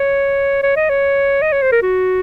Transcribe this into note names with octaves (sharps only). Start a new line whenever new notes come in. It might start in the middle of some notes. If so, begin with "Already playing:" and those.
Already playing: C#5
C#5
D#5
C#5
D#5
C#5
C5
A#4
F#4